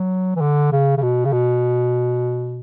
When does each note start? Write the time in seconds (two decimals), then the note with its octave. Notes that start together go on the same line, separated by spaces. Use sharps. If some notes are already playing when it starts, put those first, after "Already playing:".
Already playing: F#3
0.36 E3
0.41 D3
0.72 C#3
0.98 C#3
1.02 B2
1.25 C#3
1.33 B2